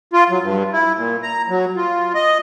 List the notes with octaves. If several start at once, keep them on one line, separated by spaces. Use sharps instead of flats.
F4
F#3
G2
E4
A#2
A#5
F#3
F4
D#5